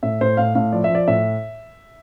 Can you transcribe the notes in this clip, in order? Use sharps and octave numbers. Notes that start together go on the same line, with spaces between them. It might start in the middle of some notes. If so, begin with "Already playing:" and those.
A2 E5
A2 C5
A2 F5
A2 F5
F3 D5
E5
F3
D5
A2 E5